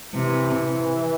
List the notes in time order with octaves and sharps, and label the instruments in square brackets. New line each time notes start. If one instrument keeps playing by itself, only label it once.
[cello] C3 [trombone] E3